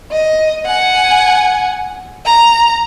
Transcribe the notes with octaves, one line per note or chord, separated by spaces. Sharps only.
D#5
F#5 G#5
A#5